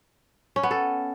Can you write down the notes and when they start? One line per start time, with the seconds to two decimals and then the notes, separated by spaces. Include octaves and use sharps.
0.56 C#4
0.63 B3
0.71 A4